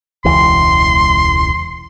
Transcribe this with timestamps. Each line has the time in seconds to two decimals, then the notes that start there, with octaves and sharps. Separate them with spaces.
0.25 E1 C#2 E3 C6